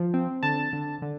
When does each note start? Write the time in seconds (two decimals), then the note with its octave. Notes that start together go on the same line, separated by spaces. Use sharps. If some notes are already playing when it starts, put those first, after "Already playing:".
Already playing: F3
0.14 C4
0.43 D3 A5
0.73 D3
1.02 D3